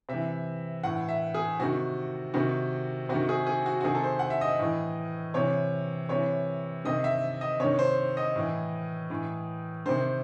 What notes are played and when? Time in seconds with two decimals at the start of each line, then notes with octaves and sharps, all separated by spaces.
0.09 C3 E3 E5
0.84 A2 E3 F#5
1.09 E5
1.34 G#4
1.60 C3 D#3 F#4
2.34 C3 D#3 F#4
3.09 C3 D#3 F#4
3.29 G#4
3.47 G#4
3.66 F#4
3.81 F#4
3.84 C3 D#3 G#4
3.95 A4
4.04 C5
4.19 F#5
4.30 E5
4.41 D#5
4.59 A2 E3
5.34 C3 E3 C#5
6.09 C3 E3 C#5
6.85 C3 D#3 D#5
7.04 E5
7.41 D#5
7.60 C3 D#3 C#5
7.79 C5
8.17 D#5
8.36 A2 E3
9.10 A2 E3
9.86 C3 D#3 C5